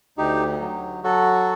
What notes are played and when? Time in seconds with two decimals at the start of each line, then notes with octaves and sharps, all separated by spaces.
0.18 D2 D#4 G4
0.60 F#3
1.04 F#3 F#4 A4